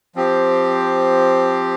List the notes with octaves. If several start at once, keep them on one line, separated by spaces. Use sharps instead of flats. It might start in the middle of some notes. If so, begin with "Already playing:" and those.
F3 C4 G4